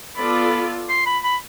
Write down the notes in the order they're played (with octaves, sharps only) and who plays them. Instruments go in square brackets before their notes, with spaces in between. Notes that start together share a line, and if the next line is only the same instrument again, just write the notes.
[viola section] B3 F4 A4 D5 [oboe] B5
[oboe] C6
B5
B5